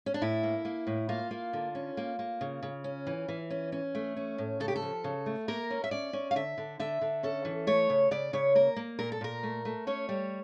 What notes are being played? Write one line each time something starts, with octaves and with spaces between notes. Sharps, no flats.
C#4
D4
A2 E4
A#3
A#3
A2
A#3 F4
A#3
D3
C#4
A#3
A#3
C#3
C#3
C#4
E3
E3
C#4
C#4
A3
C#4
A2
C#3 A4
G4
A4
F3
C#3
A3
A#3 A#4
C#4
E5
C#4 D5
C#4
F5
D3 E5
D3
D3 E5
D3
C#4 A4
E3
A3 C#5
C#3
C#3 D5
C#3 C#5
A#3 A#4
A#3
A#2 A#4
A4
A#2 A#4
A3
A3
C#4 C#5
G3